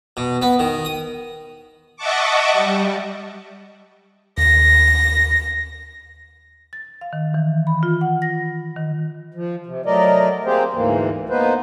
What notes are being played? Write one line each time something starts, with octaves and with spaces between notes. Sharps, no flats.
B2
B3
D#3
D#6
D#5 E5 F#5 A5 C#6 D6
G3
D#2 A#6
A6
F5
D#3
E3
B5
F4
F#5
A#6
D#3
F3
C3
F#3 A3 A#4 D5 D#5
A#3 C4 G4 G#4 C5
D2 G#2 E3 A#3
A#3 B3 D#4 B4 C5